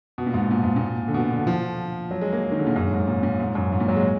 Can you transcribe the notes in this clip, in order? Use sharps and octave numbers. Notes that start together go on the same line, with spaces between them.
B2
A#2
G#2
A#2
G#2
A#2
D3
B2
D3
F3
F#3
G#3
A#3
G#3
D#3
D3
A#2
F#2
G#2
A#2
A#2
G#2
F#2
G#2
A#2
F#3
G#3